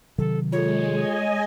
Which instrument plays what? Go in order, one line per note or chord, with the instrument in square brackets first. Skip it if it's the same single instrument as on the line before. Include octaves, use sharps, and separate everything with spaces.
[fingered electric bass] C3 D#3 F#3 [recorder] A4
[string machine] G#3 [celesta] F4 G#4 A4 [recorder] C#5
[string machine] D#5 G#5